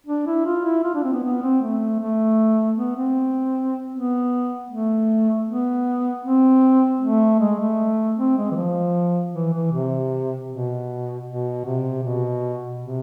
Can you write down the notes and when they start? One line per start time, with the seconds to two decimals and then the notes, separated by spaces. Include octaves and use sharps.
0.06 D4
0.26 E4
0.45 F4
0.64 E4
0.84 F4
0.94 D4
1.04 C4
1.13 B3
1.23 B3
1.43 C4
1.61 A3
2.00 A3
2.77 B3
2.96 C4
3.93 B3
4.70 A3
5.48 B3
6.25 C4
7.01 A3
7.40 G#3
7.60 A3
8.17 C4
8.37 G#3
8.51 E3
8.56 F3
9.33 E3
9.53 E3
9.72 C3
10.49 B2
11.26 B2
11.65 C3
12.03 B2
12.81 C3